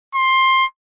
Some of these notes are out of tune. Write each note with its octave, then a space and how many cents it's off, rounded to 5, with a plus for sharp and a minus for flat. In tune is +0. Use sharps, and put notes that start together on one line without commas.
C6 +15